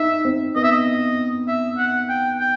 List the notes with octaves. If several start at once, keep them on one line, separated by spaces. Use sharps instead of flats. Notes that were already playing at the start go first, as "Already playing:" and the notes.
Already playing: D#4 E5
C4
B3 D#5
E5
D#5
E5
F#5
G5
G5